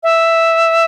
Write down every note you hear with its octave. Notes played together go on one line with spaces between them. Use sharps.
E5